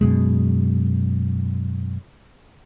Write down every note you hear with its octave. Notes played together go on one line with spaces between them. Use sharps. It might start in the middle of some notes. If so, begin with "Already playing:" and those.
F#2 B2 G#3